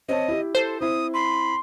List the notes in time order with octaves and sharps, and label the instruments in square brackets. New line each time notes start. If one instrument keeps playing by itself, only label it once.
[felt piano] C4 C#5 A5 [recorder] D#5
[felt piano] E4 G4
[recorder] A4 [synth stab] C5
[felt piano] C4 E4 [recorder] D#6
[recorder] B5 [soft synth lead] C6